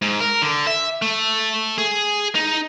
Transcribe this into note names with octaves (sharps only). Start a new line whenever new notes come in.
G#2
A#4
D3
E5
A3
G#4
D#4